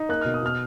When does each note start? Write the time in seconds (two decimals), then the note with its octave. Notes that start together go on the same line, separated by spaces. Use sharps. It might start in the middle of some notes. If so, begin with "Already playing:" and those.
Already playing: D#4
0.09 A#3 F#6
0.21 B2 F6
0.34 D#6
0.42 B2 F6